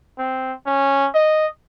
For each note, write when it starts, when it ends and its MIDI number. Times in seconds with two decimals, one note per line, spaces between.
0.18 0.53 60
0.66 1.08 61
1.14 1.47 75